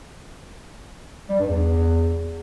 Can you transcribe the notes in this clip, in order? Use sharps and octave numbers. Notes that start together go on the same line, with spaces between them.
G3
G2
E2